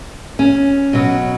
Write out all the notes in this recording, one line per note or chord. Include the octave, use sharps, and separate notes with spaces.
C#4
B2 F#3